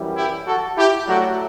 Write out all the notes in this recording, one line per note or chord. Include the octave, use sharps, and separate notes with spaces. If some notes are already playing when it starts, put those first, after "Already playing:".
Already playing: F#2 E3 G3
E4 G4
F#4 A4
E4 G4
A2 F#3 A3 D4 F#4